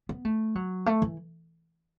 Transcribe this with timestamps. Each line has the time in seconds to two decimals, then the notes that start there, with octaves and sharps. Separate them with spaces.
0.09 B3
0.25 A3
0.55 F#3
0.86 A3
1.02 E3